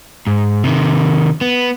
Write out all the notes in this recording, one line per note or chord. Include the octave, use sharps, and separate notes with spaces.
G#2
C3 D#3
B3